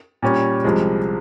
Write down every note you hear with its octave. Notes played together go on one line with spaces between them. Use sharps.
A#2 G3 C#4
C2 C3 F3 G#3